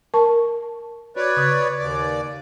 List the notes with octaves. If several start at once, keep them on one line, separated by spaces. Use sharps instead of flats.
A#4 A5 C#6
F#4 B4 C#5 D5
C#3 D#6
D#2 D5